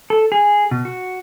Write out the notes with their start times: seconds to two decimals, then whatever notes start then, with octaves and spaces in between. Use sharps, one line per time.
0.10 A4
0.32 G#4
0.71 B2
0.85 F#4